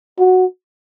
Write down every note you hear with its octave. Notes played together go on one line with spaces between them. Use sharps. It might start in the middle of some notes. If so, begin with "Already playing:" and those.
F#4